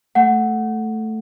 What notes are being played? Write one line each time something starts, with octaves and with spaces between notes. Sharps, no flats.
A3 F#5